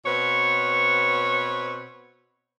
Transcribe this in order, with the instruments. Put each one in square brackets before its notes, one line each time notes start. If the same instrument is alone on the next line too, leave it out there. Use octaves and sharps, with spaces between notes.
[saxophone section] B2 C4 B4 C#5